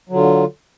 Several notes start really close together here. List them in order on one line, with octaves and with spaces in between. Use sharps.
F#3 D3 F4